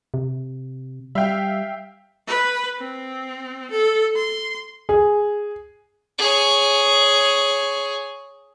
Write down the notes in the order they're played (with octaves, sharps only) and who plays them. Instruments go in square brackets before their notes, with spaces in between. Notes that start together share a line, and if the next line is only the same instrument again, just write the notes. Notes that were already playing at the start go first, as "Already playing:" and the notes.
[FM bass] C3
[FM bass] G3 [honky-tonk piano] E5 F5 G5
[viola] B4
C4
A4
C6
[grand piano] G#4
[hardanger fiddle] G#4 C#5